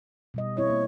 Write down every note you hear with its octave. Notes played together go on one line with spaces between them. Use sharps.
B2 G3 D#5
C4 E4 C#5 D#5
A#3